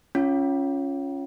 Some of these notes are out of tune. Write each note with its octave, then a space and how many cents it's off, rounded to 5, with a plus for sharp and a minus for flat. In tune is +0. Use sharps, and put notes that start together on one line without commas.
C#4 +0 F4 +0